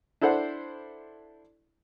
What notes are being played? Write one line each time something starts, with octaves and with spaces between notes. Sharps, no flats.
D4 E4 A4 C5 F#5